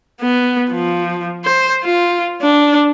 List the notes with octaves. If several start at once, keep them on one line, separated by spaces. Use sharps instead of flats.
B3
F3
C5
F4
D4